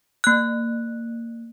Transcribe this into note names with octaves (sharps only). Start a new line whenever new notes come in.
A#3 F#6